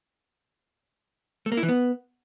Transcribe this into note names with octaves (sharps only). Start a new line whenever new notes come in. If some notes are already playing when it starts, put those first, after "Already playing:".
A3
A#3
E4
E3
B3